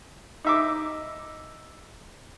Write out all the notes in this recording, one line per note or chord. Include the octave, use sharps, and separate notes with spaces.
D#4 E5 D6